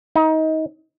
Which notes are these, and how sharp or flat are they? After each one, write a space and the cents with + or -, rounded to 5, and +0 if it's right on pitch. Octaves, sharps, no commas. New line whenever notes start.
D#4 +25